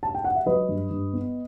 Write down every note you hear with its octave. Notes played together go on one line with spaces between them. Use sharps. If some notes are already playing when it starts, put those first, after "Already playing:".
A5
G5
F#5
E5
F#3 B4 D#5
G2
G2
B3